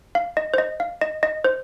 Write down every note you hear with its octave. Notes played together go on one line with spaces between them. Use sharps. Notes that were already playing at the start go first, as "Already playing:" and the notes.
F5
D#5
C5
D#5
F5
D#5
D#5
C5